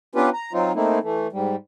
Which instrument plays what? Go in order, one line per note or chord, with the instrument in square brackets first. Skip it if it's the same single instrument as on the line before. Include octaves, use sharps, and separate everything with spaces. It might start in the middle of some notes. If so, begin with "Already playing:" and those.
[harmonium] B3 C#4 D4 F4 G4 B4
A#5
F#3 C4 D#4 F4
A3 A#3 C4 D#4 E4
E3 A3
G#2 G3